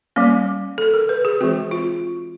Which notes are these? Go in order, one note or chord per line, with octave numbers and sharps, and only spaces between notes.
G3 A#3 C#4
A4
A#4
B4
G#4
E3 G#3 C4 F#4
F4